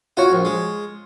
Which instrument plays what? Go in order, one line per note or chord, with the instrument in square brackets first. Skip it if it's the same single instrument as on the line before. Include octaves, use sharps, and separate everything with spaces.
[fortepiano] F4 C#5 [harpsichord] F#4
[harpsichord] A#1
G#3